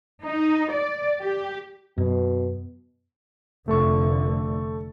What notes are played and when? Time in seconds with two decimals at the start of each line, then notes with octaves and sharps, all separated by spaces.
0.24 D#4
0.72 D5
1.22 G4
1.98 F#2 B2
3.68 F1 D3 A3 A4 C#6